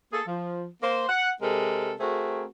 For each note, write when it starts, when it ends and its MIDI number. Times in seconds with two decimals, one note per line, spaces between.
0.13 0.22 58
0.13 0.22 68
0.13 0.22 69
0.28 0.66 53
0.83 1.07 58
0.83 1.07 72
1.09 1.30 78
1.42 1.93 48
1.42 1.93 56
1.42 1.93 69
1.42 1.93 70
2.00 2.45 57
2.00 2.45 60
2.00 2.45 66
2.00 2.45 68
2.00 2.45 70